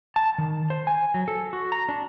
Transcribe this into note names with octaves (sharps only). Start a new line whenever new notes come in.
A5
D#3
C5
G#5
F#3
A4
F#4
A#5
D4